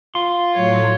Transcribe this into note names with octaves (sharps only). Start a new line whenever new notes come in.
F4 C6
A2 F#3 C#5